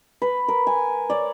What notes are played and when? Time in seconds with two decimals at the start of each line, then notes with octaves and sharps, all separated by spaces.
0.22 B4
0.48 A#4
0.67 G#5
1.10 C#5 D5